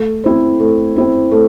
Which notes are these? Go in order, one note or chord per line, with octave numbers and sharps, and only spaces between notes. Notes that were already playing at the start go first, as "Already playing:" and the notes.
Already playing: A3
C4 E4 C5
A3
C4 E4 C5
A3